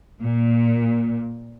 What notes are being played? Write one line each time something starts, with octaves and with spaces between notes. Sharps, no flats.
A#2